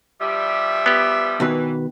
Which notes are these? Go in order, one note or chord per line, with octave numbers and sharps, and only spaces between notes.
B2 F3 G3 E5
B3 G4
B2 D#3 E3 B4